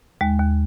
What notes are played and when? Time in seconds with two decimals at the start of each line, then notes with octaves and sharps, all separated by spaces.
0.21 D#2 G#3
0.39 D#2